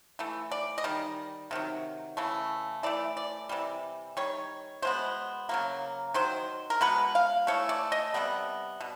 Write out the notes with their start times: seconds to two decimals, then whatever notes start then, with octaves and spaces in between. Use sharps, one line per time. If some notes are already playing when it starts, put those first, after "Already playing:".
0.19 E3 A3
0.52 D5
0.78 D#5
0.84 D#3 G3
1.51 C3 D#3 F#3
2.17 C#3 E3 A3
2.83 E3 A3 D5
3.17 D5
3.49 C3 E3 G3
4.17 D#3 G3 C#5
4.82 B2 G#3 B3 C5
5.49 C#3 F#3 A#3
6.14 D#3 F#3 C5
6.70 A#4
6.81 B2 G#3 B3 B4
7.15 F5
7.47 E3 A3 C#5
7.69 D5
7.92 D#5
8.14 C3 E3 G3 B3
8.81 B2